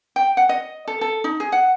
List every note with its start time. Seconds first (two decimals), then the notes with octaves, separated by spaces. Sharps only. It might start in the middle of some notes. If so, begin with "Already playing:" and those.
0.16 G5
0.37 F#5
0.49 D#5
0.88 A4
1.01 A4
1.24 D#4
1.40 G#4
1.52 F#5